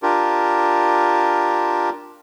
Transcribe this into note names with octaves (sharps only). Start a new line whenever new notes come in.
D4 F4 G4 A#4